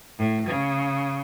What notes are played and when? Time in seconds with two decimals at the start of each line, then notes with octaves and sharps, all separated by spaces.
0.18 A2
0.47 C#3